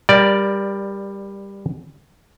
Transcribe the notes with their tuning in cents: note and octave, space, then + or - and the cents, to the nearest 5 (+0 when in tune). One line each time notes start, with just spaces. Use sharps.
G3 +15 A#4 +25 D5 +0